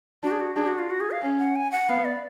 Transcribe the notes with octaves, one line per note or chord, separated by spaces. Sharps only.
D4 F#4
G#4
F#4
D4 G#4
F#4
F4
F#4
G#4
F5
C#4
F#5
G#5
F#5
B3 F5
D5